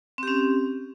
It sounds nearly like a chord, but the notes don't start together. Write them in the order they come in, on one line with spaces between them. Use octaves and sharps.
C4 G4 C#4